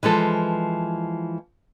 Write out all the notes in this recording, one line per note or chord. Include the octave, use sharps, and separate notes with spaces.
E3 F3 G#3 A4